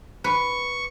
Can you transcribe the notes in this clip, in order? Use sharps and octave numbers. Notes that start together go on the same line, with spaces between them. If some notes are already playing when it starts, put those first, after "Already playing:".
B4 C#6